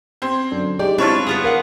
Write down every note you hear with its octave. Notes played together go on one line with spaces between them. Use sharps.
C4 C6 G#6
F#2 D3 D4
G3 G#3 D#4 G4 D5
C4 D4 E4 F4 C#5 A5
B3 F4 G#4
A#4 F5 F#5